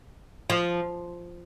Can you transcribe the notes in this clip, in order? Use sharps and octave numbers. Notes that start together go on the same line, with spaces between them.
F3